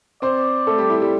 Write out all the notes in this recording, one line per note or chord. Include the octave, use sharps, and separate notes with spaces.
C4 C5 D5
A3 A4
G3 G4
E4
G3 G4